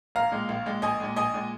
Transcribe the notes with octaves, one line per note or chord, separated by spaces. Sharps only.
A#1 F5 A#5
A#2 G#3
A#1
A#2 G#3
A#1 D#5 G#5
A#2 G#3
A#1 D#5 G#5
A#2 G#3